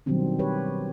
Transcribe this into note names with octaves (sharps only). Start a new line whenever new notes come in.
B2 D#3 F#3 G3 C4 D4
G4 B4 C#5